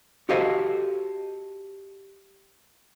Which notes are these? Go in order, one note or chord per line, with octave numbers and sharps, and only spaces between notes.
F#4 G4 A4 C5 D#5 F5